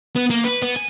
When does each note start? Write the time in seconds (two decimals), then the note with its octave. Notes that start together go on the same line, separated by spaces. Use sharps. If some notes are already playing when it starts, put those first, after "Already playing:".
0.15 B3
0.30 A#3
0.44 B4
0.62 B3
0.76 G#5